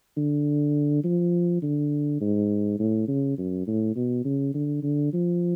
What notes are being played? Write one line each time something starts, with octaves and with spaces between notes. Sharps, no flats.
D3
F3
D3
G#2
A2
C#3
F#2
A2
B2
C#3
D3
D3
F3